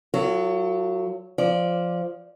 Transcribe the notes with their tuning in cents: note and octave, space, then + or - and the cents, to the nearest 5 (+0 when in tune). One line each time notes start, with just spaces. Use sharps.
F#3 +0 F4 -35 A4 +40
F3 +0 D5 +0